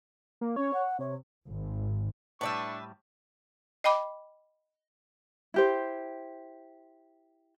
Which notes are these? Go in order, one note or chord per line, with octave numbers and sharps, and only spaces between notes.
A#3
C#4 C#5
F#5
C3 C#5
G#1
A2 G3 D4 B4 D5 E5 C#6
D#5 G5 B5 D6
E4 G4 C5